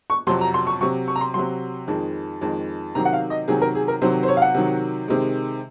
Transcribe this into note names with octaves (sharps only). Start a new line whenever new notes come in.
C#6
F2 C3 F#3 C6
A#5
C6
C#6
C3 F#3 C#6
C#6
A#5
C6
C3 F#3 C6
F2 D#3 G#3
F2 D#3 G#3
C3 D#3 F#3 A#5
F#5
F5
D#5
C3 D#3 F#3 G#4
A#4
G#4
A#4
C3 D#3 F#3 C5
C5
C#5
F5
F#5
C3 D#3 F#3
C3 D#3 G#3